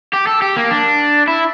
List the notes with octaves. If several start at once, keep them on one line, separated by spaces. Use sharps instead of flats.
G4
A4
G4
A#3
D4
E4